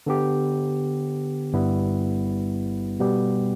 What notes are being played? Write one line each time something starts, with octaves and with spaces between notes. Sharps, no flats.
D3 B3 G4
G1 G2 G3 B3 E4
B2 G3 B3 G4